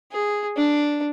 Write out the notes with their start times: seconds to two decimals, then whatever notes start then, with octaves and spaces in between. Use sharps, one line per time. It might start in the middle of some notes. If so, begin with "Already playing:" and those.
0.12 G#4
0.57 D4